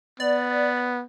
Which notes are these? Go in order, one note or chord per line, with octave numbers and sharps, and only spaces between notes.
B3 D5